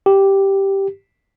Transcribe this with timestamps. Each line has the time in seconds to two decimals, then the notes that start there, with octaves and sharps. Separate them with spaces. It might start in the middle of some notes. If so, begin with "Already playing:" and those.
0.06 G4